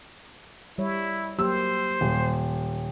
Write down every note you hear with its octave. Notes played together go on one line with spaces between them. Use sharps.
G3 E4 C#5
F#3 A#3 G4 C5 E6
D#1